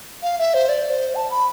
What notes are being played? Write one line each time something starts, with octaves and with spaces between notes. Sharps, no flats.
F5
E5
C5
D5
D5
C5
A5
B5